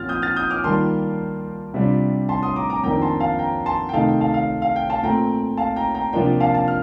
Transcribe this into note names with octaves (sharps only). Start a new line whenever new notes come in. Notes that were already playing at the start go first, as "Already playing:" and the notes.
Already playing: A#2 F3 C4 F6 A6
D#6 G6
F6 A6
D#6 G6
D6 F6
D#3 G3 A#3 F4 A5 C6
C3 G3 D4 F4
A5 C6
C6 D#6
A#5 D6
A#5 D6
F2 D#3 A#3 D4 G5 A#5
A5 C6
F5 A5
G5 A#5
A5 C6
G5
C3 D#3 A3 C4 D#4 F5 A5
G5
F5 A5
F5
F5
G5
F5 A5
A#2 A3 C4 G5 A#5
F5 A5
G5 A#5
G5 A#5
C3 F3 A#3 D4 F4 G5
G5
F5 A5
F5 A5
F6